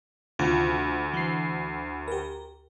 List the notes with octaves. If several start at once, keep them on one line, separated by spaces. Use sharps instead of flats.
D2 C3 D#3 F4
E3 C7
G4 A#4